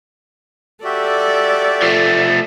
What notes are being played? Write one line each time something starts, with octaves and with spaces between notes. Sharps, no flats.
F#4 G4 A4 D5 E5
F3 A3